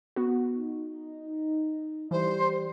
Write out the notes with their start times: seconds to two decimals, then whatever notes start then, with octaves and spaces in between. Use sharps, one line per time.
0.16 B3 F#4
0.56 D#4
2.11 E3 G3 C5